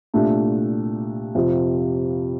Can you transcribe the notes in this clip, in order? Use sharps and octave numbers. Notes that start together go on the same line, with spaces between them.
C2 A#2 A3 D4
F2 C3 F3